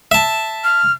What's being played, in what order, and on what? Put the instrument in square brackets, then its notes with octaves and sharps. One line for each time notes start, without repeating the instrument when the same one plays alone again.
[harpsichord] E5 A5
[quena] F6